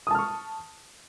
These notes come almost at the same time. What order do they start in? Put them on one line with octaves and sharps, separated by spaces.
D#6 A5 F6 C#6